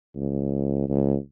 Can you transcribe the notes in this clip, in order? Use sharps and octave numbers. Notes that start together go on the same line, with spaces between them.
C#2
C#2